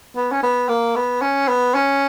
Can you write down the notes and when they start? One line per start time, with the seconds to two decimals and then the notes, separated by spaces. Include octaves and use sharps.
0.16 B3
0.32 C#4
0.43 B3
0.69 A#3
0.96 B3
1.22 C#4
1.48 B3
1.75 C#4